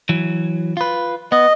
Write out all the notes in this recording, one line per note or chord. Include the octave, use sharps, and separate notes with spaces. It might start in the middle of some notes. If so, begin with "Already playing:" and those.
E3 F#3
F4 B4
B3 D#5